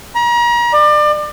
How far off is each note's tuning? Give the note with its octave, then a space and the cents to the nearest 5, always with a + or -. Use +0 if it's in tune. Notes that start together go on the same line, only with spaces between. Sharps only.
A#5 +35
D5 +30